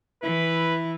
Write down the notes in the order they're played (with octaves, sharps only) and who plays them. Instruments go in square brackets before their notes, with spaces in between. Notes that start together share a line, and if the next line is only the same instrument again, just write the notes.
[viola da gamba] E3 [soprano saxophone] E4 [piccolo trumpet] B4